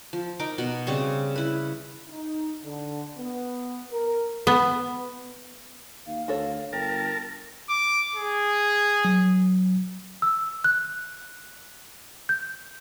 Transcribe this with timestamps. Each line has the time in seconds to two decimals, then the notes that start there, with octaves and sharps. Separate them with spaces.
0.13 F3
0.40 D#4 A#4 D6
0.58 B2 F#5
0.87 C#3 G3 C4 C#6
1.36 E4 B4
2.08 D#4
2.63 D3
3.18 B3
3.91 A#4
4.47 B3
6.07 D#2 F5
6.28 D2 F#4 A4 C#5
6.73 G1 A#4 G5 A5
7.70 D6
8.16 G#4
9.05 F#3
10.22 E6
10.64 F#6
12.29 G6